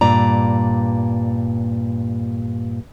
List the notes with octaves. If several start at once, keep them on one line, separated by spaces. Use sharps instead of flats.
G2 A#2 D5 A#5